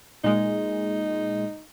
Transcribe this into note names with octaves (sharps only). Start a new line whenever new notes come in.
A#2 G#3 D#4